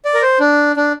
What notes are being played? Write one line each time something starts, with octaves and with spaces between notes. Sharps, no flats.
D5
A#4
C5
D4
D4